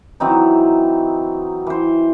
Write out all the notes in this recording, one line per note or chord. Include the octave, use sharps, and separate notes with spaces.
E3 F#3 C4 D#4
E3 C5